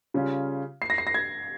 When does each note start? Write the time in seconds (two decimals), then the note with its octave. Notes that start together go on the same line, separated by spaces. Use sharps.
0.14 C#3 G3 C#4 F4
0.82 C7
0.90 A#6
0.98 C7
1.07 A#6
1.14 G#6